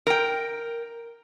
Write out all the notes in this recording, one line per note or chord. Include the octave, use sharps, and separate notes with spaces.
A#4 G5